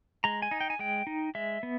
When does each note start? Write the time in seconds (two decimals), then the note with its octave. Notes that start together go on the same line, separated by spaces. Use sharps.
0.24 G#3 A#5
0.42 G#5
0.51 D#4
0.60 G5
0.70 G#5
0.79 G#3 G5
1.07 D#4
1.35 G#3 E5
1.63 B3